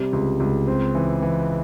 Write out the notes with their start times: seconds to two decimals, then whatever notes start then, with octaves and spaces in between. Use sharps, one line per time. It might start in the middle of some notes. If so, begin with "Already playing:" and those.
Already playing: C3 G3
0.13 C#2
0.40 C#2
0.67 C4
0.95 E3
1.22 E3